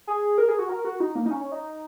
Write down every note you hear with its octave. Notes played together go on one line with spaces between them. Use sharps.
G#4
A#4
G#4
F#4
A#4
F#4
D#4
A#3
D#4
C#4
C#4
D#4